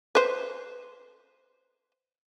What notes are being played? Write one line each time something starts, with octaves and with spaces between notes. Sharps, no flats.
B4 C5